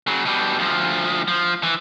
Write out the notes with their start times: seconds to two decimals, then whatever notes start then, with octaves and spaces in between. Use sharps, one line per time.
0.07 C#3 F#3
0.25 B2 G3
0.59 D2 F3
1.28 F3
1.63 E3